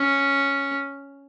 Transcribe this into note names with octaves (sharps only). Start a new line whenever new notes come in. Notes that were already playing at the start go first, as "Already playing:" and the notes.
Already playing: C#4